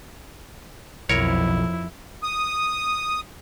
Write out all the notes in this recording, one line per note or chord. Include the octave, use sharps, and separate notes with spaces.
B1 F2 E4 A#4 C#5
D#6